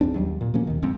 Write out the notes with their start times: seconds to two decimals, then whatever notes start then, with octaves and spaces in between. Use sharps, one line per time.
0.01 E2 C4 D4
0.14 D#2 F#3 G3
0.41 A#2
0.54 B2 F3 A#3 C#4
0.67 D#2 D#3
0.82 G1 F2 G#3 C4